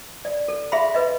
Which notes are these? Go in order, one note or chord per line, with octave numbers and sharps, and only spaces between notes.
D5
A4
G#4 E5 F5 B5 C6
B4 D#5